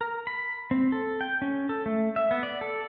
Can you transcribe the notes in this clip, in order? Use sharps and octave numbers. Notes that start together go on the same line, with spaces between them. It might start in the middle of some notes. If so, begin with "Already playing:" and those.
A#4
B5
C4
A4
G5
C#4
A4
A3
E5
B3
D5
A4